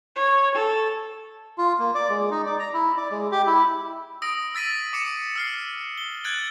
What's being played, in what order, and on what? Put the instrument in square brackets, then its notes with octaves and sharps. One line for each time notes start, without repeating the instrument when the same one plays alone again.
[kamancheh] C#5
A4
[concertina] F4
A#3
D5
G#3
D#4
D5
A#5
E4
D5
G#3
G4
E4
[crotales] D#6 E6 A#6 D7
E6 A6 B6 D#7
D6 C#7 E7
E6 F6 C7
G7
F#6 G#6 A6 D7 F#7 G7